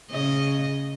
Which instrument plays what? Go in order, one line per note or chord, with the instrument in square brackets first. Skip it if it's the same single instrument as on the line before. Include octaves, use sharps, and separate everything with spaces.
[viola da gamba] C#3 D#5